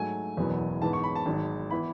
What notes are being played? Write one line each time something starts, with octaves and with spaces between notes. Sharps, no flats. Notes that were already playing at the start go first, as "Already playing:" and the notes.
Already playing: G#2 F#3 A3 G#5
F#1 E2 B2 F#3 B3
G#2 E3 B3 A5
C#6
B5
A5
G#1 G#2 F#3
E3 B3 E4 B5